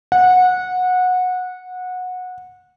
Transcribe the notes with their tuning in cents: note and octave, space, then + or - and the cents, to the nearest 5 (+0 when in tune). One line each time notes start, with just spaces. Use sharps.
F#5 -20